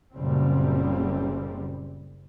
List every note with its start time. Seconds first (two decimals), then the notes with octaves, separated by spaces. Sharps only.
0.12 F#1 A#2 C#3 G3 C4